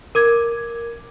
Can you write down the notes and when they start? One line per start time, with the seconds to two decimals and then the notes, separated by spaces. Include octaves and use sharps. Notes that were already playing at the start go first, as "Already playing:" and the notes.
0.15 A#4 D6 G#6